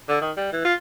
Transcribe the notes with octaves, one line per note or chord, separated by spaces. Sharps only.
D3
D#3
G3
E3
F4